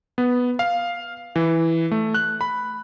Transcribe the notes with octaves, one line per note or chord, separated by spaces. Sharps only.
B3
F5
E3
A3
F#6
B5